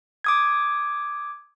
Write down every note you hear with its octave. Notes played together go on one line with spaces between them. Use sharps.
D6 D#6 G#6